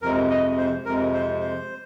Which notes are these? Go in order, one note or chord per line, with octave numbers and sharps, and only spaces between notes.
F2 C3 G#3 A#4
D#5
C5
F2 C3 G#3 A#4
C5
C5